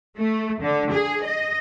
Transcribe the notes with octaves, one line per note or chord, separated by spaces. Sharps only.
A3
D3
G#4
D#5